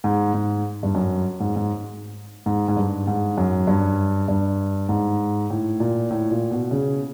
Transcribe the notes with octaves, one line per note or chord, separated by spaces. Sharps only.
G#2
G#2
G2
F#2
G#2
G#2
G#2
G#2
G2
G#2
F#2
G2
G2
G#2
A2
A#2
A2
A#2
B2
C#3